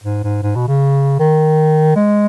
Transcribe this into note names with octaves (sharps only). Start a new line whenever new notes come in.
G#2
G#2
G#2
B2
C#3
D#3
G#3